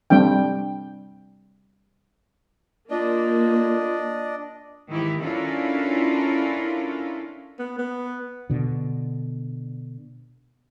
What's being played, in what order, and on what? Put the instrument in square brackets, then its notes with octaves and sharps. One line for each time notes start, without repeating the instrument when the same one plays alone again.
[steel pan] G3 C4 D4 G5
[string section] A#3 [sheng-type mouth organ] D4 D5 D#5 [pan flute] F4
[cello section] G#2 D#3 E3 E4 G4
C#4 D4 E4 F4 A4 A#4
[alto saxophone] B3
B3
[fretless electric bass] B2 D3